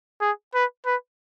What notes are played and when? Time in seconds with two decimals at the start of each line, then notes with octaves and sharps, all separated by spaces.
0.21 G#4
0.55 B4
0.86 B4